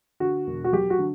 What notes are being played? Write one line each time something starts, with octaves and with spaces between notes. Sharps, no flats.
D3 F#4
E1
F#4
F#3 G4
F#4
D3